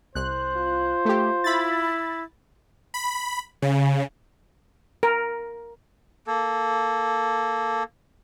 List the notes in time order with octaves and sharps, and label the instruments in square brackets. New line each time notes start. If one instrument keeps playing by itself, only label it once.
[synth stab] C2 F#6 [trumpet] C5
[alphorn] F4
[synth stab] A3 G4
[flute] E4 [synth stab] B5 A6
[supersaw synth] B5
C#3
[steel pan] A#4
[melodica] A#3 A4